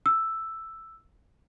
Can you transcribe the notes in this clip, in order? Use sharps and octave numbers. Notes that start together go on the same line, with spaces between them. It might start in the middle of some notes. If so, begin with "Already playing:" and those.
E6